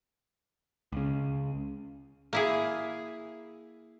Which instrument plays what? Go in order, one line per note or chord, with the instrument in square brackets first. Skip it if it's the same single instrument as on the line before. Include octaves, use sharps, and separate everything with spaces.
[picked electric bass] C#2 C#3
[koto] A#3 E4 G#4